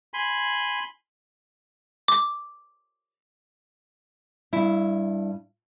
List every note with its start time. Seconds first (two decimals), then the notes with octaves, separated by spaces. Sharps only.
0.14 G#5 B5 C6
2.08 D6
4.53 G2 E4